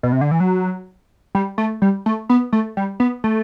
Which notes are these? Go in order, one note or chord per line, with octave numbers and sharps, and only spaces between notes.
B2
C3
D3
E3
F#3
G3
A3
G3
A3
B3
A3
G3
B3
A3